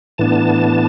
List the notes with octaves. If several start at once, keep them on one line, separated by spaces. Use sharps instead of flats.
A2 E3 B3 D4 A5